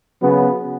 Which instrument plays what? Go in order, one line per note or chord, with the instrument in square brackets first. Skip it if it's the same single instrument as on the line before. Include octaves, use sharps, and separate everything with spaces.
[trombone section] C#3 F#3 B3